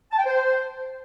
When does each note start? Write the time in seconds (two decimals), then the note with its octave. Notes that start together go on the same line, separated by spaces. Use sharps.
0.12 A5
0.19 G5
0.26 C5